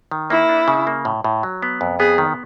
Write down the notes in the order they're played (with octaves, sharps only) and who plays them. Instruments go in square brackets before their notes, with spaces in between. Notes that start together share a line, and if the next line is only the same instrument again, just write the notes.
[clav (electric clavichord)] D#3
[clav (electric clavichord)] A#3 [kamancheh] E4
[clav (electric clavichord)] D4
C#3
A#3
A2
A2
F#3
B3
F2
[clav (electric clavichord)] B3 [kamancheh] G#4
[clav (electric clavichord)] D#3